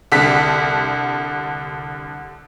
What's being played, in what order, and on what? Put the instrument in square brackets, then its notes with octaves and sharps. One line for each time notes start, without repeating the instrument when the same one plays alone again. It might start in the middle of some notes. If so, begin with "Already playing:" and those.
[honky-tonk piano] C2 D3 B6